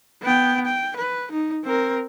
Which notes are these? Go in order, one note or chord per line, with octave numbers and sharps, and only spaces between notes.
B3 G5
G5
B4
D#4
C4 A#4